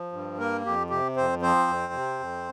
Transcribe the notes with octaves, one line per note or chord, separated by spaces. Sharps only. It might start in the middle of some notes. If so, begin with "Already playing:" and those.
Already playing: F3
G2
A#3 A#4
F2 G4
C3 G4
F2 C4 C5
F3 C4 C5
F2
C3
F2